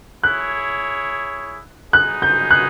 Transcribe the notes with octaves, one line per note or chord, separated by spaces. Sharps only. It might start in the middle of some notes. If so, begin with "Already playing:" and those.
E4 G#4 C#5 F#6
G#3 B3 D#4 G#4 F#6
G6
F#6